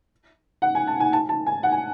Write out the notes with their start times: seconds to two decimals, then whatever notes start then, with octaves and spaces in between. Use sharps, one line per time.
0.62 F#5
0.75 G#5
0.87 A5
1.00 G#5
1.13 A5
1.29 A5
1.46 G#5
1.63 F#5
1.72 G#5